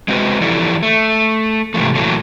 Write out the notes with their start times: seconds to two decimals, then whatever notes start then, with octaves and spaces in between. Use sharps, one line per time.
0.08 G#3 C4 F#4 B4
0.41 E3 F3 E4 G4 A4 D5
0.83 A3
1.74 G#2 C3 E3 F3 A3
1.95 A#2 E3 F#3 A3